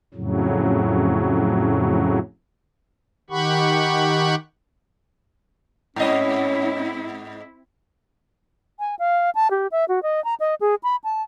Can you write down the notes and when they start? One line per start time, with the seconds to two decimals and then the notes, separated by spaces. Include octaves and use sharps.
0.14 F2 A2 C#3 F#3
3.30 D#3 G4 F#5 B5 C#6
5.96 G#2 C4 C#4 E4 D#5
8.79 G#5
8.99 F5
9.35 A5
9.51 G4
9.72 E5
9.88 F#4
10.03 D#5
10.24 A#5
10.40 D#5
10.60 G#4
10.83 B5
11.04 A5